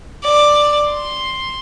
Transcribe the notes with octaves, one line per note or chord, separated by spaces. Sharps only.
D5
C6